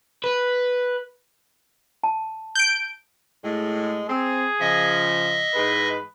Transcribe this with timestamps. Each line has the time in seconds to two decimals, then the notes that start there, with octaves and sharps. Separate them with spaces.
0.24 B4
2.04 A5
2.55 G6 D7
3.44 A2 G#3
4.09 C4 G#4
4.60 C#3 F3 D#5 E5
5.55 G#2 E3 G#3 B4